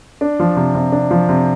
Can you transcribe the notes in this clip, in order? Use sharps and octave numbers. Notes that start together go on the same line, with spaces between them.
D4
F3
C3
C3
D4
F3
C3